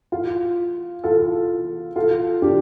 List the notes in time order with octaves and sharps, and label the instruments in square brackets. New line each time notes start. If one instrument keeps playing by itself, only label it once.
[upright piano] F4
F4 A4
F4 A4
D4 G4